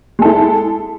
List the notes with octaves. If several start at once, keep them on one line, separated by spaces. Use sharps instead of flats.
G#3 E4 A4